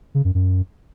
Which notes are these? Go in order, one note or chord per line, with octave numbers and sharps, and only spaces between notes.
C#3
F#2
F#2